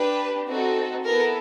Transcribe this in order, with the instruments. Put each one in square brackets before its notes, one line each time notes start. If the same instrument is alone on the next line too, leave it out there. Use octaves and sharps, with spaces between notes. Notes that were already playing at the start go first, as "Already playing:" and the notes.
Already playing: [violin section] D4 G4 B4
C4 D#4 F#4 A4
B3 E4 A4 A#4